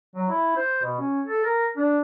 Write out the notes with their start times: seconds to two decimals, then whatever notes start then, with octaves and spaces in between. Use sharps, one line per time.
0.15 F#3
0.29 E4
0.56 C5
0.82 B2
1.00 C#4
1.26 A4
1.45 A#4
1.76 D4